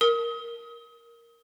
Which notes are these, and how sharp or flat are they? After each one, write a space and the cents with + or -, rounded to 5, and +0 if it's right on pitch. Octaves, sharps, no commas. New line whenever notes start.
A#4 +0 D#6 +35